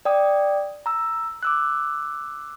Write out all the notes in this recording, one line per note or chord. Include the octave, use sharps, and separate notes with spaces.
D5 G5 D#6
A#5 E6
D6 E6 F#6